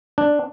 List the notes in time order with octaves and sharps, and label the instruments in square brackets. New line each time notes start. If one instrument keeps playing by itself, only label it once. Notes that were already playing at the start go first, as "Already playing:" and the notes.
[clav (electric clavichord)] D4